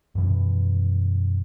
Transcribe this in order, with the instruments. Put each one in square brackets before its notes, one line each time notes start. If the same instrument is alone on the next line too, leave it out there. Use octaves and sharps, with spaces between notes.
[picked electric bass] F#2 B2 E3